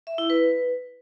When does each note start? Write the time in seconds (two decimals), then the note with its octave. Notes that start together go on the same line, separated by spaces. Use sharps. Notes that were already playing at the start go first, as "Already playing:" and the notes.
0.07 E5
0.18 E4
0.30 B4